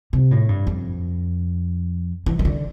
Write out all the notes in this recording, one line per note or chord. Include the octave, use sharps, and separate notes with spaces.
C3
A2
G2
F2
E3
E3
D3